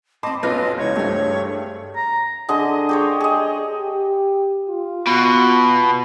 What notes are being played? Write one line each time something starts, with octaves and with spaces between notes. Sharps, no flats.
C4 D#5 A5 B5 C6 D6
B1 C#4 F4 B4 D#5 F6 A#6
C#2 E3 C#5
G2 A3 G4 G#4 C5
A#5
D3 G#4 D#5
G4 C5 C#5
G#4 D#5
G4
F4
B2